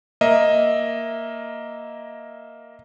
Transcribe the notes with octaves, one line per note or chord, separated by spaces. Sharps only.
A#3 D#5 E5